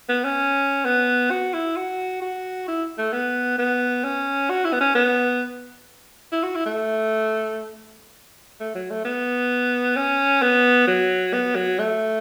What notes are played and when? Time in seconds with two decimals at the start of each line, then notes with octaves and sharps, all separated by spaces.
0.09 B3
0.24 C#4
0.85 B3
1.30 F#4
1.53 E4
1.76 F#4
2.22 F#4
2.68 E4
2.98 A3
3.13 B3
3.58 B3
4.04 C#4
4.50 F#4
4.65 E4
4.73 B3
4.80 C#4
4.95 B3
6.32 E4
6.43 F#4
6.55 E4
6.66 A3
8.60 A3
8.75 F#3
8.90 A3
9.05 B3
9.97 C#4
10.42 B3
10.87 F#3
11.33 B3
11.55 F#3
11.79 A3